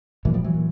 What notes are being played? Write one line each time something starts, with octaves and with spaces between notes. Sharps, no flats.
A#2 E3 F#3
F3 G3
E3 F#3
A#2